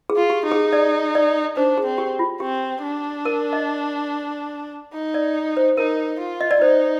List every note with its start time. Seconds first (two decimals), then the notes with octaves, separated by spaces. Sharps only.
0.10 G#4
0.16 F4
0.30 G4
0.45 D#4
0.52 G#4
0.73 D5
1.15 D5
1.57 D4 C5
1.78 G#4
1.85 C4
1.98 G4
2.19 F4
2.40 C4 G4
2.83 D4
3.25 A#4
3.53 D#5
4.93 D#4
5.14 D5
5.57 C5
5.77 D#4 A#4
6.19 F4
6.41 D#5
6.51 D5
6.62 D#4 C5